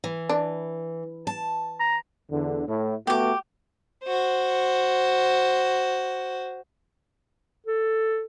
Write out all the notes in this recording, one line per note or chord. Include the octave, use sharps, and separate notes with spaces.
E3
D4
A5
A#5
E2 D3
A2
A3 B3 F#4 G4 D6
F#4 C5
A4